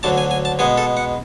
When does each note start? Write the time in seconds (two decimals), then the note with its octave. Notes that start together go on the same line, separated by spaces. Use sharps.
0.03 D2 D3 F#3 A5
0.18 G#5
0.31 G#5
0.45 A5
0.59 B2 G#3 B3 G#5
0.78 A4
0.97 F#5